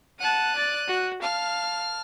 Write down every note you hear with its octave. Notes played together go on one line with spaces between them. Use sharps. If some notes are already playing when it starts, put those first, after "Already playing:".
F#5 A5 F#6 D#7
D5 A6
F#4
F5 A5 F6